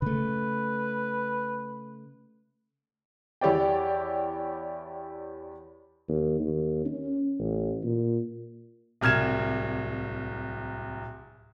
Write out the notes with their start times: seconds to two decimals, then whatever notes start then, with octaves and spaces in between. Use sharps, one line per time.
0.02 C#3 A3 B4
3.41 E2 E4 G4 C#5 D5 G5
6.08 D#2
6.40 D#2
6.85 C#4
7.39 A1
7.83 A#2
9.01 D1 C2 F6 G#6 E7